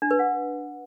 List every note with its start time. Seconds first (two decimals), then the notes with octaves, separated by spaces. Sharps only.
0.02 D4
0.11 B4
0.19 F#5